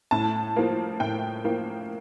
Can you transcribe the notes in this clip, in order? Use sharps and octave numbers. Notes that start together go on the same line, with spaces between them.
A2 A5
F3 A#3
A2 G5
F3 A#3